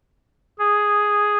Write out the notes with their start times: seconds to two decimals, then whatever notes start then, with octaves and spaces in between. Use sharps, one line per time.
0.59 G#4